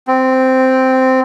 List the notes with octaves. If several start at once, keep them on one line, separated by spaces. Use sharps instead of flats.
C4